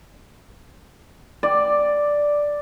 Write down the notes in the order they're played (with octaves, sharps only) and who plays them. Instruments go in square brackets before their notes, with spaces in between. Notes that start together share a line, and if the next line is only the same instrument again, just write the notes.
[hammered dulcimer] D5